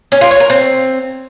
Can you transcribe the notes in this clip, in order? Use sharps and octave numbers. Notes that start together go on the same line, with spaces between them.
C#4
F4
C#5
A#4
C4